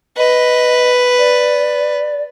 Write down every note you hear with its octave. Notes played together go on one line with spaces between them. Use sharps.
B4 D#5
D5